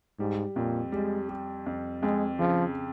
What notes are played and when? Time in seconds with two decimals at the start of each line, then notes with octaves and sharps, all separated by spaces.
0.19 G#2 G3
0.56 F2 A#2
0.92 G3 G#3
1.29 G3
1.66 F2
2.02 F2 G#3
2.39 C#3 F3